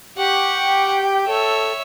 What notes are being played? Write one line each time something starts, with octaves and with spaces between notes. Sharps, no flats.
G4 F#5 G5 C#6
A4 C#5 E5